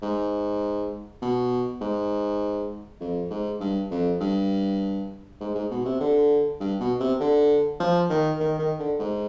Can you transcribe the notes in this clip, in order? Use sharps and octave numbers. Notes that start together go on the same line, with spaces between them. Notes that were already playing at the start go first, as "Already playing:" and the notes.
G#2
B2
G#2
F2
G#2
G2
F2
G2
G#2
G#2
B2
C3
D3
G2
B2
C3
D3
F3
D#3
D#3
D#3
D3
G#2